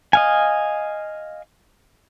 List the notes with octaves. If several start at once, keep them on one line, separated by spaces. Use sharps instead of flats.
D#5 F5 G#5